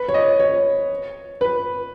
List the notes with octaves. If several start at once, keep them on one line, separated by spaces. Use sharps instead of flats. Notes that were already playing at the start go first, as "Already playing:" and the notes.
Already playing: B4
C#5
D#5
C#5
B4